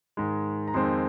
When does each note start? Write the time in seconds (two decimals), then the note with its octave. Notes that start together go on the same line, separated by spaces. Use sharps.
0.17 G#2 D#3 G#3
0.68 A#5
0.74 F2 D#3 G#3 C4 C6